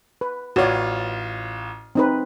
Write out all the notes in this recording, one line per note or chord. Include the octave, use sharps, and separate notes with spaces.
B4
A1 F4 F#4 C#5 D5
C4 D#4 B4